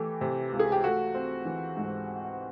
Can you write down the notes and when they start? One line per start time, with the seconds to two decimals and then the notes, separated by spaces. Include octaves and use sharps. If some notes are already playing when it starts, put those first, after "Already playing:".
Already playing: E3 A3 G4
0.21 C3
0.53 C#2
0.59 G#4
0.72 G4
0.84 A3 F#4
1.15 C4
1.45 E3
1.77 G#2